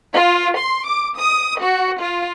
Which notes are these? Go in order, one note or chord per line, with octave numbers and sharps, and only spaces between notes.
F4
C6
D6
D#6
F#4
F4